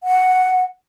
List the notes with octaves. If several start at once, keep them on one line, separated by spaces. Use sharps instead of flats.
F#5